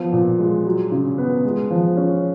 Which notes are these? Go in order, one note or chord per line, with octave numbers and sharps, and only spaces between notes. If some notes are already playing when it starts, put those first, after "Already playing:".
Already playing: F3 B3
A#2
G#3
F#3
C#3
B3
G#3
F3
C#4